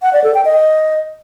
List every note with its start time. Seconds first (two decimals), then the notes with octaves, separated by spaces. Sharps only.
0.02 F#5
0.13 D5
0.24 A4
0.34 G5
0.45 D#5